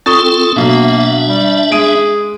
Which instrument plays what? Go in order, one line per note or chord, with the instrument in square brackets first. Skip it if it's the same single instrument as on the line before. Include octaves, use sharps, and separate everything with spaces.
[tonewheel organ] C4 F4 A4 [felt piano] C#6 D#6 A6
[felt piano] B2 F#3 [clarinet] A#3 [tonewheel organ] D4 E5
[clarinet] G3
[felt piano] G#3 D7 D#7 [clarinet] G#4